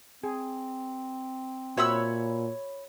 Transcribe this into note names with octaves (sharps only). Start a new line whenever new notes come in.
C4 G#4
A#2 F#4 C5 C#5 E5 B5 E6